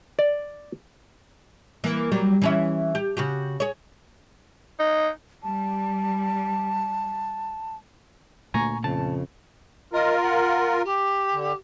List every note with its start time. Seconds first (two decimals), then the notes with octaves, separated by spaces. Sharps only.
0.19 D5
1.84 E3 A#3
2.12 F#3 G3 A#3
2.42 E3 C#4 E5
2.95 G4
3.17 C#3 F#4 G4
3.60 G#4 C#5
4.80 D#4
5.43 G3 A5
8.54 D2 A#2 A3 A#3 G#5 A#5 C#6
8.84 F2 C#3 A5
9.93 F4 A#4 D#5
10.22 F#5
10.84 G4
11.33 D3